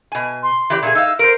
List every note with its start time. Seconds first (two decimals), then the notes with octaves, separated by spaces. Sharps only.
0.12 B2 G#5
0.43 C6
0.70 E3 G4 D5
0.83 A#2 D#4 G#4
0.95 D#4 F5 E6
1.19 A#4 C5 D7